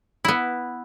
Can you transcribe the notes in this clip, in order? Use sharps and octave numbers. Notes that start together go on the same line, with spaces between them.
B3 E4